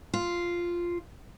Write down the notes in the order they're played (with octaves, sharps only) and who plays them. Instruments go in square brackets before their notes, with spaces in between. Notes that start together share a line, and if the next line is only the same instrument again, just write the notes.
[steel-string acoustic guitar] F4